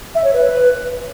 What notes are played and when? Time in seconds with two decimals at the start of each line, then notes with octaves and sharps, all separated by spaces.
0.15 E5
0.24 C#5
0.33 B4